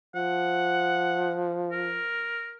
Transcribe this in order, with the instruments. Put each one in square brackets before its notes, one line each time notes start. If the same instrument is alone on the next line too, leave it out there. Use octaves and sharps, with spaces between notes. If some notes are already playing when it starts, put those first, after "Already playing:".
[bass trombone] F3 [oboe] F#5
[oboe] A#4